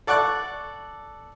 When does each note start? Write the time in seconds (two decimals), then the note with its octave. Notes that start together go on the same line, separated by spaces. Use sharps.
0.07 A4 D5 F#5 C#6 D6 F#6